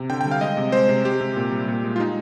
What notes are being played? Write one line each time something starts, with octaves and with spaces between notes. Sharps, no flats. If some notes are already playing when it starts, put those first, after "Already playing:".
Already playing: C3
D3 G5
G5
G3
F5
G#3 D#5
C3
G#3 C5
C3
G#3 G4
C3
A#2
G3
A#2
G#3
F4
G#3 D#4